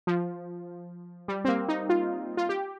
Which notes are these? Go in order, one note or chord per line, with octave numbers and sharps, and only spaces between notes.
F3
G3
C4
A#3
D#4
F4
F4
G4